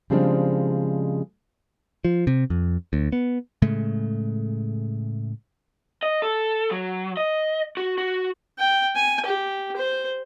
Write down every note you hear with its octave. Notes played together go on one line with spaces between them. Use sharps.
C#3 F3 G3 G#3 C4 D4
F3
C3
F2
D2
B3
A2 C#3 G#3 A3
D#5
A4
F#3
D#5
F#4
F#4
G5
G#5
G4
C5